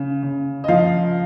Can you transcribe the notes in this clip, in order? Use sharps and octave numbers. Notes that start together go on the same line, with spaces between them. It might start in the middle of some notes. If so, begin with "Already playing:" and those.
Already playing: C#3
C#3
D#5
F3 F5